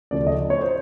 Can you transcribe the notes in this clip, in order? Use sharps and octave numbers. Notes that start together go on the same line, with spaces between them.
D2 C#3 F3 A3 D5
D#5
C#5
C5